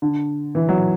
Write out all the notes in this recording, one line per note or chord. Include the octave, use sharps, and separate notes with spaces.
D3
E3
F#3